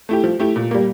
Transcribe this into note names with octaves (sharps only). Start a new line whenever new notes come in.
A3 E4 G4
F3
A3 E4 G4
A#2
G3 A#3